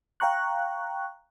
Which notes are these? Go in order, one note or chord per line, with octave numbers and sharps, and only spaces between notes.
F5 G5 A#5 C#6 F#6